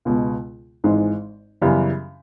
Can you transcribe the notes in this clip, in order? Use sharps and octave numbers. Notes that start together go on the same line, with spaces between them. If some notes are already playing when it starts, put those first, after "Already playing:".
C#2 B2 G#3
G#1 G#2 E3 G#3
F#2 C#3 E3 G3 B3